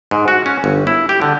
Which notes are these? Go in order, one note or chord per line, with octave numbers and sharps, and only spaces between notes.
G#2
F#4
C#4
G1
E4
G4
D3